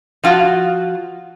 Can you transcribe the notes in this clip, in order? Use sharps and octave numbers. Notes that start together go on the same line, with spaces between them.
F3 F4 F#4